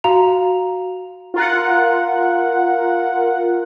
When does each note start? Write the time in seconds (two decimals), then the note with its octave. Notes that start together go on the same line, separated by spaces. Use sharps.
0.04 F#4 F5 A#5 F7
1.34 F4 A#4 F#5